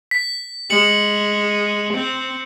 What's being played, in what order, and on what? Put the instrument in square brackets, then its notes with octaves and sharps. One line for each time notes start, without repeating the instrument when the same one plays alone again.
[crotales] B6
[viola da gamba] G#3 [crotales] C#7 F#7
[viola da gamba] C4